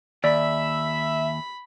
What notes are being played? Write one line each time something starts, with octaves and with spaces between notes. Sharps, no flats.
D#2 D5 E5 B5